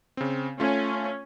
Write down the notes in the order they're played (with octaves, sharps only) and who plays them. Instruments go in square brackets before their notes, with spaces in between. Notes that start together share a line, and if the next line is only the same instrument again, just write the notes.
[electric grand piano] C#3 C4
[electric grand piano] A3 F4 [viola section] C#4